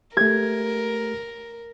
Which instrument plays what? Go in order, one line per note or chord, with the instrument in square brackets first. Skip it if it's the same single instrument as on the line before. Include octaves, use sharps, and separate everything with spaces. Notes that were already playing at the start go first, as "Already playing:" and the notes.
[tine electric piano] A3 G4 [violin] A#4 [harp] G#6